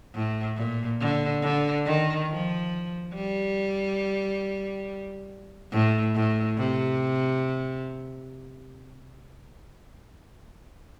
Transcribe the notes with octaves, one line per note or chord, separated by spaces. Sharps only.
A2
A#2
D3
D3
D#3
F3
G3
A2
A2
C3